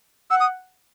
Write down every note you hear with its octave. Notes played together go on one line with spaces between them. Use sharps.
F#5 E6
D#6